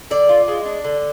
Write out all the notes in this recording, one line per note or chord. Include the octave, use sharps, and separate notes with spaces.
D3 D5
F4
G#3
D4
D3